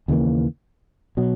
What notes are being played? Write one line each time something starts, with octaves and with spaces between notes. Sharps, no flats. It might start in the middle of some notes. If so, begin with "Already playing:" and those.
D#2 C#3 E3 A#3
B2 F#3